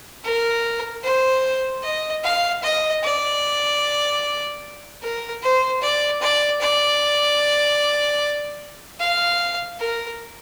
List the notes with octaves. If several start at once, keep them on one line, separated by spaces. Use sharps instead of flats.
A#4
C5
D#5
F5
D#5
D5
A#4
C5
D5
D5
D5
F5
A#4